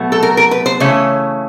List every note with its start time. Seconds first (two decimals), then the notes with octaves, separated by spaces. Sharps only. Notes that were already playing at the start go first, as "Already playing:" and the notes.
Already playing: B2 F#3 A3
0.12 A4
0.23 A#4
0.37 A#4
0.51 B4
0.66 C5
0.80 C#3 E3 A3 C#5